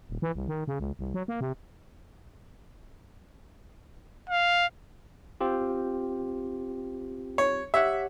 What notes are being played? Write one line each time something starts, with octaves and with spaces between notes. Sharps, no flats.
D#1
E3
C2
D#3
C#3
C#2
C2
F#3
A#3
C3
F5
C4 F4 G4
C#5
G4 C#5 E5 F#5